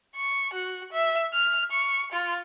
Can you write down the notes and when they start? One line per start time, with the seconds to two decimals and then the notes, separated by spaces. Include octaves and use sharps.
0.16 C#6
0.53 F#4
0.92 E5
1.34 F6
1.71 C#6
2.12 F4